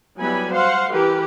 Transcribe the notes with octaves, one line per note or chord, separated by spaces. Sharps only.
F#3 G3 B3 E4 G#5 B5
C5 F5 F#5 C6
E3 G4 A#4 B4